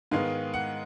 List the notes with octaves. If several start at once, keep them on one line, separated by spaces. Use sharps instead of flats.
G#2 D#3 G#3 B3 F5
F#5